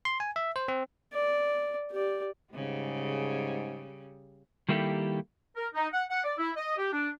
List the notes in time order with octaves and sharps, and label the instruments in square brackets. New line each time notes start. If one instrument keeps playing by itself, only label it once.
[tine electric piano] C6
G#5
E5
C5
C4
[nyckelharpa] D5
G4 D5
[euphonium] G#2 [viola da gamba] C#3 G3
[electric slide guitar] D#3 G3 A#3 E4 G4 A4
[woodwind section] A#4
D#4
F#5
F#5
D5
E4
D#5
G4
D4